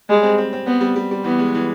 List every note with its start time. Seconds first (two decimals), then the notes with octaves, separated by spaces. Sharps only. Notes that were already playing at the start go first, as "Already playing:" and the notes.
0.09 G3 G#3
0.23 C4
0.38 C4
0.53 C4
0.67 B3 C4
0.81 G3
0.96 G3
1.11 G3
1.24 E3 B3
1.39 G#3
1.55 E3